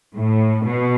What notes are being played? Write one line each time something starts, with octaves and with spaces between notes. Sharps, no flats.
A2
B2